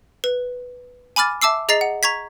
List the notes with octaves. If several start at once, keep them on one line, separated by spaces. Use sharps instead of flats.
B4
G#5 B5 D6 F6 A6
E5 A5 D6 E6 C7
G#4 D#5 A#5 A6 C7
F#5
A#5 C#6 G#6 B6